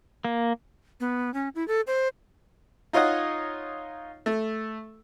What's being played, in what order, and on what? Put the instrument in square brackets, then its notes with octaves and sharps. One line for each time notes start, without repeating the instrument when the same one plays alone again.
[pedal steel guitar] A#3
[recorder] B3
C#4
E4
A4
C5
[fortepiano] D#4 F4 C#5 D#5 F#5
A3